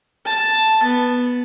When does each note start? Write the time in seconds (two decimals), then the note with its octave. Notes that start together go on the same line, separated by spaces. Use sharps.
0.25 A5
0.83 B3